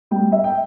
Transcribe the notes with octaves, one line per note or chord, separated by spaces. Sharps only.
G3 G5
E5
G5